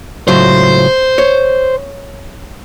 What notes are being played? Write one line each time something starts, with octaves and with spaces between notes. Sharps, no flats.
C#2 A2 F#3 C5
C#5